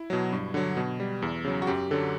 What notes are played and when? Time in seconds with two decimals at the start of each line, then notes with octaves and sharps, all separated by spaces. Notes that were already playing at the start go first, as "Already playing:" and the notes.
Already playing: E4
0.10 B2 F#3
0.33 G2
0.54 D3 F#3
0.77 B2
1.00 G3
1.22 E2
1.45 C#3 F#3
1.62 F#4
1.67 F#2 G4
1.91 D3 F#3 A4